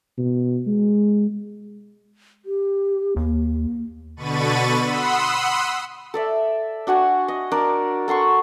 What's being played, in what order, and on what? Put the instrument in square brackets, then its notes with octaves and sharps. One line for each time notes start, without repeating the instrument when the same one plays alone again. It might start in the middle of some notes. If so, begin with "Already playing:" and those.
[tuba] B2
G#3
[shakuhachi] G4
[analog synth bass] D#2 [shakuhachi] A#3
[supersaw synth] B2 D3 B5 C#6 A6 D#7
F#5 B5 C6 D#6 E6
[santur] A4 D5 E5
D4 F#4 F#5 G#5
D#5
D4 A#4 D5
A4 F#5 C6 C#6